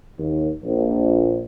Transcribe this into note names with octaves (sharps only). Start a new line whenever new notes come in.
D#2
A#1